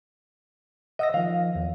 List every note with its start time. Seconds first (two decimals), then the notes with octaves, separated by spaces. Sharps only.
0.99 D#5 F#5 E6 A#6
1.14 D#3 F3 F5
1.56 E2